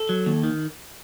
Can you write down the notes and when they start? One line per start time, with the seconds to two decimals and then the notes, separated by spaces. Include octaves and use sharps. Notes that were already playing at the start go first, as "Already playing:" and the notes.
Already playing: A4
0.09 F#3
0.26 D#2
0.43 D#3